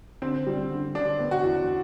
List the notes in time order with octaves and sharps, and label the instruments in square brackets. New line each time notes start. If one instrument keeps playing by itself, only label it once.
[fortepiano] D3 [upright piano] C4
[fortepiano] G3
D3
[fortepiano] D3 [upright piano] D4
[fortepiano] B3
[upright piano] F#4
[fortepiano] E2